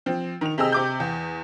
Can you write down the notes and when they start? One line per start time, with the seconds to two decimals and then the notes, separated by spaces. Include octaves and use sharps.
0.06 F3 C4
0.41 D#3 F7
0.58 C3 C4 G#4 D#5 E6
0.72 C3 D6 G6
1.00 E2